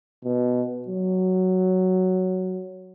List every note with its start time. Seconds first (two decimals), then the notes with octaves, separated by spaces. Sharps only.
0.24 B2
0.88 F#3